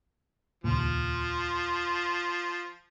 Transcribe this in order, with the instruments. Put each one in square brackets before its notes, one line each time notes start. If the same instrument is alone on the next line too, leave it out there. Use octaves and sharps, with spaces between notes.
[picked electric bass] D#1 C#2 A#2 [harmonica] F3